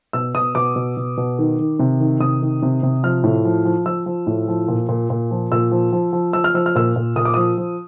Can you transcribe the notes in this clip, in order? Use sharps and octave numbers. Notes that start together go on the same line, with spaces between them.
B2 E6
B2 D#6
B2 D6
B2
B2
B2
D#3
D#3
C3
D#3
C3 D#6
D#3
C3
C3
F3 F6
A2
F3
F3
F3 E6
F3
A2
F3
A#2
A#2
A#2
F3
A#2 E6
F3
F3
F3
F3 E6
F6
F3 E6
F6
A#2 E6
A#2
A#2 D#6
D6
F3 D#6
F3